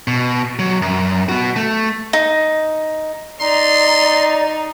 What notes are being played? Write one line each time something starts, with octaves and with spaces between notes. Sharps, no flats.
B2
B1 F#3
F#2
B3 F#4
A3
D#4
D#4 D5 A#5 C6